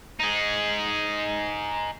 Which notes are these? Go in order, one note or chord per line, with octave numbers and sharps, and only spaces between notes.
D#4 G#4